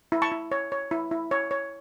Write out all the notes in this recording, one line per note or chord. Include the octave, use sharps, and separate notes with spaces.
E4
A5 C#6
E4
C#5
C#5
E4
E4
C#5
C#5